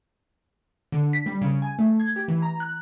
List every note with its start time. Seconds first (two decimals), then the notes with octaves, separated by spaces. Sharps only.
0.92 D3
1.13 B6
1.26 G3
1.41 C#3
1.62 G#5
1.79 A3
2.00 G#6
2.16 G4
2.28 E3
2.42 A#5
2.60 F#6